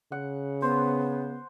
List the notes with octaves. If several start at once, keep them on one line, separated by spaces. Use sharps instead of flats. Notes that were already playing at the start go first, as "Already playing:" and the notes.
C#3 F#5
B3 C5